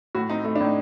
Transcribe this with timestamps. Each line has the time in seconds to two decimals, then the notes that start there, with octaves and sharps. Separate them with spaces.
0.15 A2 F#4
0.30 C4 D#4
0.44 A3 D#4
0.56 D4
0.61 A2 D#4